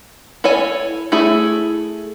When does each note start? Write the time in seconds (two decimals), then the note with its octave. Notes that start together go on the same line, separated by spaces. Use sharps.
0.44 E4 A4 C#5 G#5
1.12 A3 E4 G#4